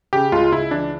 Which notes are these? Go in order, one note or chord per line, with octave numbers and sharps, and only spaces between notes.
C#3 G4
C#2 F4
C#2 E4
E3 D4